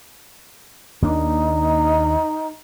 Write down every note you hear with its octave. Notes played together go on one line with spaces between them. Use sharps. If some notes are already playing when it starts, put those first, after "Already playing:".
D#2 A#3 D4 D#4